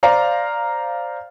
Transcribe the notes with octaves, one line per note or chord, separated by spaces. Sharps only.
C5 D5 F5 A#5